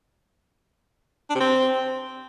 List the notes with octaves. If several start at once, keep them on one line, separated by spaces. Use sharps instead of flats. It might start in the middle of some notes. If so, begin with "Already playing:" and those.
D4
C3
C4